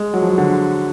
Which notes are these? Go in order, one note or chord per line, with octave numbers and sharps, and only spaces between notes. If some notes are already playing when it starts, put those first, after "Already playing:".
Already playing: G#3
F#3
F3
F#3
D3